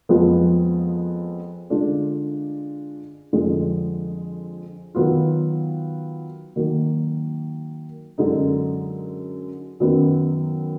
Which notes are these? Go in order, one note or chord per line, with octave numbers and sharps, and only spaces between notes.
F2 F3 G#3 B3 F4
D3 G#3 D4 F4
F2 D3 G#3
D#3 F#3 B3 F4
D#3 F#3 A#3
F#2 D3 G#3 D#4
F#2 D#3 F#3 B3